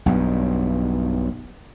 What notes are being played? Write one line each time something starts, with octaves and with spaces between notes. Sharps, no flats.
B1 G2